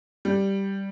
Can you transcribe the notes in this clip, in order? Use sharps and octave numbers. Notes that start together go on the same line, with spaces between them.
G3